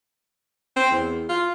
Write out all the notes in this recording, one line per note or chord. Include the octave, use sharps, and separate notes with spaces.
C4
E2
F4